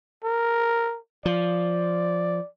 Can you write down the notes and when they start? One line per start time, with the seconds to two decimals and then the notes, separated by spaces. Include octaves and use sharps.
0.24 A#4
1.26 F3 D5